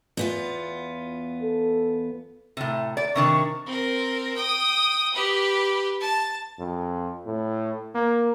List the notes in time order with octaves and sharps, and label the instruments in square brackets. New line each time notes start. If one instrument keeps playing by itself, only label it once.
[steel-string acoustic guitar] E2 B3 F4
[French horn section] A4
[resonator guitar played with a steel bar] A2 C3
D5
[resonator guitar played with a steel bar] C3 D#3 D4 [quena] C#6
[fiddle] C4 A#4
G5 D#6
G4 B4
A5
[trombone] F2
A2
A#3